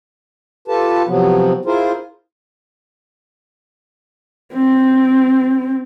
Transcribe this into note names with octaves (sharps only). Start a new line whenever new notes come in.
F4 G4 A4 B4 A5
C3 F3 F#3 B3 C4
E4 F4 G#4 A#4 C5
C4